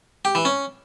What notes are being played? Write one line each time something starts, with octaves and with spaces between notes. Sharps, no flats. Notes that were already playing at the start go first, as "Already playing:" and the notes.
G4
E3
C#4